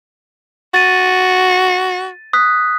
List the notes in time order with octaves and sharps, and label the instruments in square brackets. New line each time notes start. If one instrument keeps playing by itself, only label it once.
[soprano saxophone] F#4 [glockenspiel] A6 D#7
[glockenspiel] D#6 F#6 B6